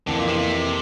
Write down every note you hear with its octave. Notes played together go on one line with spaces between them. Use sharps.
F2 D3 E3 A#3
A#2
C3
C3